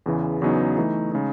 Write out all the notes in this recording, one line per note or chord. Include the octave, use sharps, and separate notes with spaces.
E2 C#3 E3
E2 C#3 F#3 B3 D#4
E3 A3 D#4
C#3 G#3 D#4